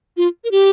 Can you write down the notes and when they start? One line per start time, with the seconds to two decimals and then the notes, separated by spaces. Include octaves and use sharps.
0.17 F4
0.44 A#4
0.51 G4